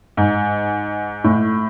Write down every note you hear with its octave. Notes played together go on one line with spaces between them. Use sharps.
G#2
A2